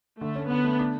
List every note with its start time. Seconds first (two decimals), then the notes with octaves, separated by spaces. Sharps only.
0.21 D3 A3
0.36 C#4
0.50 D3 B3
0.65 A3
0.79 D4